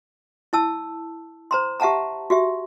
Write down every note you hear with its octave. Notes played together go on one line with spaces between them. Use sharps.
E4 A5 E6
C5 A#5 C6
G4 E5 F#5 A5 A#5
F#4 G4 E5